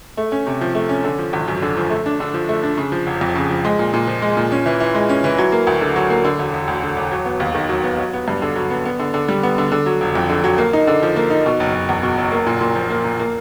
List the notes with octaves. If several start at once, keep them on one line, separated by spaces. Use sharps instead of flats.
A3
C#4
C3
F3
A3
C#4
D3
F3
G#1
F#2
D3
F3
A3
D4
D3
F3
A3
D4
C#3
F3
F1
F2
C#3
F3
G#3
A#2
A#2
F3
G#3
A#2
C#4
E3
E3
G#3
C#4
E3
F#3
A#3
D2
D3
F#3
A#3
D3
E1
E1
D2
D3
E1
F#3
B3
D#2
D#3
F#3
B3
F#3
B3
G2
D3
F#3
B3
B3
D3
D3
G3
B3
D3
D3
F#3
F1
F2
D3
F#3
A#3
D#4
D3
F3
A#3
D#4
B2
F#1
F#1
E2
B2
F#1
A#3
A#2
A#2
F3
A#3
A#2
A#3